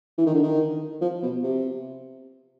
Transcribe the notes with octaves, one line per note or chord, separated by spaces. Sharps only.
E3
D#3
D3
D#3
F3
B2
C3